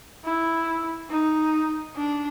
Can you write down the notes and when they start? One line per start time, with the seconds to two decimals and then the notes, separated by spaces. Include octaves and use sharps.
0.24 E4
1.10 D#4
1.96 D4